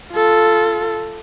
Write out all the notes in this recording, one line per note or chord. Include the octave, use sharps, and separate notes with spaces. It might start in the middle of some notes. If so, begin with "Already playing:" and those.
F4 A4